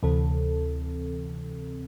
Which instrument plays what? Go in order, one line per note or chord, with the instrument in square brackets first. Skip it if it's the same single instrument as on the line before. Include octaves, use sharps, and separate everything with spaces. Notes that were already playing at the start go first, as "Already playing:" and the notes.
[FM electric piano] D2 C3 E3 C4 A4